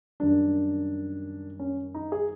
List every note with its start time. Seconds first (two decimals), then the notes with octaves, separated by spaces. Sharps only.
0.20 F#2 D#3 G3 D4
1.60 C#4
1.95 D#4
2.12 G#4